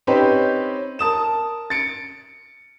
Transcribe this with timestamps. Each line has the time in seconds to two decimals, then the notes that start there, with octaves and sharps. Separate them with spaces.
0.07 C4 C#4 D#4 G4 B4 C5
0.99 A#4 A5 D#6 E7
1.70 A6 C#7 D7